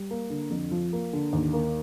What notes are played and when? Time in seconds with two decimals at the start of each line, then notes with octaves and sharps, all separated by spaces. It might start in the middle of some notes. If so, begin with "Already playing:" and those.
Already playing: G3
0.11 A#3
0.30 D3
0.50 F2
0.71 F3
0.93 A#3
1.13 D3
1.33 D#2
1.53 A#3